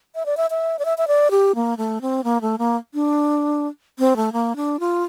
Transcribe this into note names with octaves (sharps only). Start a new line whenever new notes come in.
E5
D5
E5
E5
D5
E5
E5
D5
G4
A#3
A3
C4
A#3
A3
A#3
D4
C4
A3
A#3
D4
F4